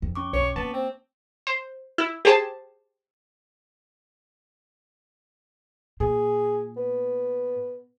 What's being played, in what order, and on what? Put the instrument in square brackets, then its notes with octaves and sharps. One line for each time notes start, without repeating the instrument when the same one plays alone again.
[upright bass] F2
[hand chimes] C#4 C#6 D6
[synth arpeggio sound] B1 [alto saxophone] C#5
[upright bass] A#3 [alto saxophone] B3 [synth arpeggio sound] A5
[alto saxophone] C4
[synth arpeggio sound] C5
E4
G4 G#4 C5 A5
[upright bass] A#2 [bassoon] G#4
[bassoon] B3